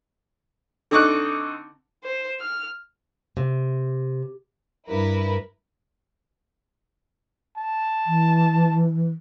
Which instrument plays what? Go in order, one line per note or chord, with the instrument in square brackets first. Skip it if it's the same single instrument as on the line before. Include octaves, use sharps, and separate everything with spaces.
[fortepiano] D3 C4 D#4 C#6 D6 F#6
[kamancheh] C5
F6
[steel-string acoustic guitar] C3
[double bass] G2 [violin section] E4 A#4 B4
[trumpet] A5
[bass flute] E3